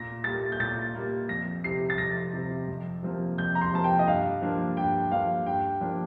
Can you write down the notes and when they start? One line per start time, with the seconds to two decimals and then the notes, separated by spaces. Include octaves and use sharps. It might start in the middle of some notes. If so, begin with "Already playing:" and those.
Already playing: A#2 A#6
0.24 G3 A#3 A6
0.52 G6
0.60 A#2 A6
0.95 G3 A#3
1.29 F2 A#6
1.64 C3 G3 C7
1.90 A6
1.98 F2 A#6
2.33 C3 G3
2.68 F2
3.03 C3 F3 A#3
3.38 F2 G6
3.55 A#5
3.61 C6
3.73 C3 F3 A#3 A5
3.84 G5
3.99 D#5
4.07 G2 F5
4.42 F3 A#3 D4
4.77 G2 G5
5.11 F3 A#3 D4 F5
5.46 G2 G5
5.81 F3 A#3 D4